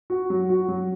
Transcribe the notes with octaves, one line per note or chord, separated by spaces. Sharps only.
F#4
F#3
F#4
F#3